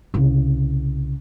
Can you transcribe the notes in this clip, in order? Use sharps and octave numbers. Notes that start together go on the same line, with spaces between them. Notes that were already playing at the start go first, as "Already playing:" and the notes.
C2 C#3